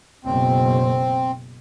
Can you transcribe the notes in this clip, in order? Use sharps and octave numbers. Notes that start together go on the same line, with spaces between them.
F#1 B2 C4